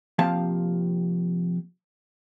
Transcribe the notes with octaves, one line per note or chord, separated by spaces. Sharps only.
C3 F3 A#3 G4 F5 A5